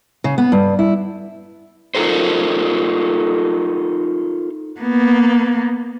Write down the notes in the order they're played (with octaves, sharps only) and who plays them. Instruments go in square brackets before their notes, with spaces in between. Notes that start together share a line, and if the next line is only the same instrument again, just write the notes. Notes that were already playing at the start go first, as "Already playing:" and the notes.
[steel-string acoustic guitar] C#3
B3
G2
E4
[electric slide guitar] D#4 F4 A4 A#4 C5
[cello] A#3 B3